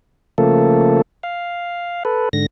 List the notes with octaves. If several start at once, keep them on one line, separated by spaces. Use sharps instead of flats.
C#3 F3 A3 A#3 A4
F5
A4 B4
G#2 D3 A#6